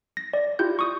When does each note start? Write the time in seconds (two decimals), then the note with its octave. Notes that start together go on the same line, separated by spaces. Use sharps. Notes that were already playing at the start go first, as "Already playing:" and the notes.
0.17 A#6
0.34 D5
0.59 E4 F4 G4 G6
0.79 C#6 D#6